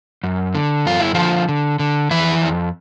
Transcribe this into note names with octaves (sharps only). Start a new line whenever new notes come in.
F#2
D3
F#2 F4
E4
D3 F3 F4
D3
D3
F2 E3 E4
F2